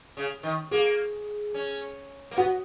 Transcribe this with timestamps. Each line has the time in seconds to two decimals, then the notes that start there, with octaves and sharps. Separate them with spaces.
0.17 C#3
0.43 D#3
0.71 A#3 G#4
1.54 C#4
2.31 A#3
2.37 B3 F#4